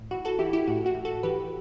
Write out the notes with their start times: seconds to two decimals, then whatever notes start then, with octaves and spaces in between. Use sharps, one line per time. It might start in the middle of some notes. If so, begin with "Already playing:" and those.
Already playing: A2
0.11 E3 F#4
0.25 F#4 A4
0.39 E3 E4 G4
0.53 E4 G4
0.67 A2 F#4
0.86 F#4
0.95 A2
1.05 F#4 A4
1.23 E3 G4 B4